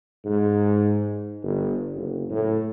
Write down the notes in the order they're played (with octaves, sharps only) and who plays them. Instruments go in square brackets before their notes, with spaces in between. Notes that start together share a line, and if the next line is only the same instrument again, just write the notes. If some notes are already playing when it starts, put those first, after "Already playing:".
[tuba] G#2
G1
F#1
A2